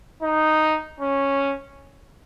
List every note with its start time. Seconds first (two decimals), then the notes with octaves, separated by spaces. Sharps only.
0.22 D#4
1.00 C#4